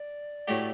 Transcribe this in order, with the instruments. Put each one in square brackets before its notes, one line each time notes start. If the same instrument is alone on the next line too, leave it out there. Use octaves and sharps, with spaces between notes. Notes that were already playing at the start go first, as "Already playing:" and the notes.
Already playing: [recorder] D5
[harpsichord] A2 F#3 A3 D4 G4